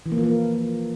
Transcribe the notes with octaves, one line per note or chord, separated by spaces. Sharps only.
E3
A#3
F3
A#3